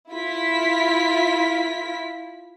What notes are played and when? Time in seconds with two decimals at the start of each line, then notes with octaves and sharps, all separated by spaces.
0.12 E4 F4 B6